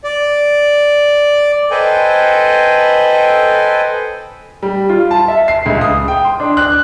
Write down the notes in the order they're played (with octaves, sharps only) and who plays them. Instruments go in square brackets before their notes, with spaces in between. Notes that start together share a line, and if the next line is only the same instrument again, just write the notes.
[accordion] D5
[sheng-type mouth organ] A4 B4 C5 D#5 G5 G#5
[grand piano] G3
F4
A5
E5
C7
C#2
D#6
G5
C6
D4
F#6